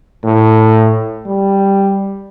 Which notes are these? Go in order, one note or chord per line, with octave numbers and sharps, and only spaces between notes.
A2
G3